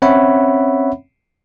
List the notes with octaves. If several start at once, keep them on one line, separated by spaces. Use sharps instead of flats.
C4 C#4 C#5 E5 F#5 B5